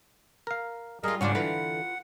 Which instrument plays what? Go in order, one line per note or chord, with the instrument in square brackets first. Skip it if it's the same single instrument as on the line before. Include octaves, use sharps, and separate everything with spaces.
[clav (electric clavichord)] A#4 F5
[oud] G3 F4 [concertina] G#4 A#4 D#5
[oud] G#2 C#3 D4 [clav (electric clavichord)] C#4 F4 D5 [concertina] F#5
[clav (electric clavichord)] D3 E3 [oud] F4 A#4 B4